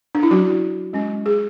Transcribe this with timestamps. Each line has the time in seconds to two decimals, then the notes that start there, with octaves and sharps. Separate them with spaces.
0.15 D4
0.23 E4
0.31 F#3 C#4 F#4
0.93 G#3 C#4
1.26 G#4